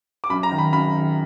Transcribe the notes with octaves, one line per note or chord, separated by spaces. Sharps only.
D6
F#2 B5
A#5
D#3
B5
F#2 B5
D#3